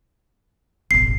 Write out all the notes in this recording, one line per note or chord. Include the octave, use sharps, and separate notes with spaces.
E1 A1 C7